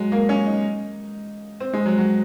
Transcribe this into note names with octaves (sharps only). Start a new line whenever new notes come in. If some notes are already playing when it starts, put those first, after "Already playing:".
Already playing: F#3 G#3
A#3
C#4
D#4
C4
G#3
F#3
F#3